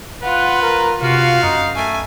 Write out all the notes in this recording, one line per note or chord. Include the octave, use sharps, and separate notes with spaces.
F4 B4 F#5
A#4
C3 F4 F#4 F5
F#2 D#4
A3 G#5